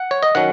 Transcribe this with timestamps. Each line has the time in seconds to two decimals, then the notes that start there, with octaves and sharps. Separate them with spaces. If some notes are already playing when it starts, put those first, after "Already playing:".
Already playing: F#5
0.11 C#5
0.23 D#5
0.35 D#3 F#3 C#4 F#5